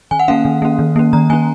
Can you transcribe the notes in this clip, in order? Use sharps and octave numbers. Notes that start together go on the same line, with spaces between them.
D#3 G#5
F#5
A#3 C#4 F5
D#3
A#3 C#4
D#3
A#3 C#4
D#3 A#5
A#3 C#4 G#5